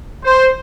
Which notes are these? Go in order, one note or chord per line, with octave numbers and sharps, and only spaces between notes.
C5